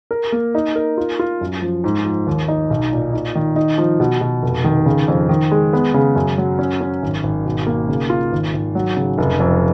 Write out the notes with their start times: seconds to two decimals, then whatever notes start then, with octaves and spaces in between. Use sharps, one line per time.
0.11 A#4
0.32 A#3
0.55 D#4
0.76 A#4
0.98 F4
1.19 F4
1.41 F#2
1.62 F3
1.84 G#2
2.05 F3
2.27 D#2
2.48 D#4
2.70 B1
2.92 A#2
3.13 D#4
3.35 D#3
3.56 D#4
3.78 F3
4.00 B2
4.21 B2
4.42 F1
4.64 D#3
4.86 C#3
5.08 F2
5.29 D#3
5.51 G#3
5.73 B3
5.94 C#3
6.16 F#2
6.38 F#3
6.59 C#4
6.81 C#4
7.02 G#1
7.23 G#1
7.45 B2
7.67 A#3
7.89 C#3
8.10 F4
8.32 G#1
8.54 G#1
8.75 F#3
8.97 C#3
9.18 F1
9.40 F2